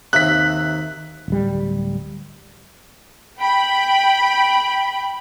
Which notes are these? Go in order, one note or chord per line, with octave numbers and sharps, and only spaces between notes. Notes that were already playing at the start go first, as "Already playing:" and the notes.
D#2 C3 E5 F#6 B6
D1 G3
G5 B5